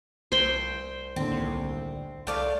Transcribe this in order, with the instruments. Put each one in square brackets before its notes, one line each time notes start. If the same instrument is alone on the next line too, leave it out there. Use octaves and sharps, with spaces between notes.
[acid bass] C2 [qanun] C5 G5
[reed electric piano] D#2 A2 D3 [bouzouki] C4
[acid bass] C2
[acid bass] C2 [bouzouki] A3 D5 F5